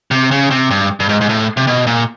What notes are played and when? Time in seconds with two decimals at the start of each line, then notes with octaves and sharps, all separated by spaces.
0.11 C3
0.31 C#3
0.51 C3
0.71 G2
1.00 G2
1.09 G#2
1.21 G#2
1.29 A2
1.57 C3
1.67 B2
1.87 A#2